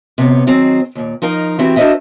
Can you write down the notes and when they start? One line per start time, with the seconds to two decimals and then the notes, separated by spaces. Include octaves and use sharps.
0.18 C3 B3 C#4
0.47 D#3 F#3 C4 G#4
0.95 D#2 A#2
1.22 F3 D#4 A#4 F5
1.59 E3 C4 E4 F#4 G4
1.76 D4 F#4 A#4 C5 D#5 E5